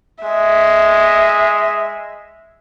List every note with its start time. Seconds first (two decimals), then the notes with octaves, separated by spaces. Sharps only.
0.23 G#3 E5